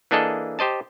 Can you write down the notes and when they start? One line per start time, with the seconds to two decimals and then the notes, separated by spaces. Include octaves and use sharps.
0.11 E3 A#3 D4 G#4 A4 D#5
0.59 G4 C5 D#5 A5